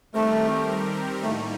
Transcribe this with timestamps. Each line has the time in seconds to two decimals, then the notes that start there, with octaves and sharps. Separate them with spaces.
0.14 D#3 G3 A3 C4 G4 A#4
1.23 A2 G3 A3 A#3 D#4